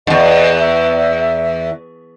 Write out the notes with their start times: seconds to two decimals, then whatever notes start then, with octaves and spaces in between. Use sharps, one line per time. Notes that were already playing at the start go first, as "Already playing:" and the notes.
0.07 E2 G#2 D#5
0.59 E5